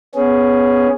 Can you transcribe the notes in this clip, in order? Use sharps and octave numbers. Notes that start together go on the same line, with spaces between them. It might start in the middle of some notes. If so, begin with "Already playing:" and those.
B3 C#4 G#4